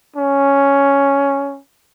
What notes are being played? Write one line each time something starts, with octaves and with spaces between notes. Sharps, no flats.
C#4